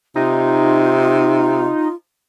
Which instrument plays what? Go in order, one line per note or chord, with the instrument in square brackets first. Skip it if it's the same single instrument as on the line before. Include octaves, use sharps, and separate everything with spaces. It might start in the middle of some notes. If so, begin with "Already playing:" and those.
[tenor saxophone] C3 [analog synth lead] D#4 [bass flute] F4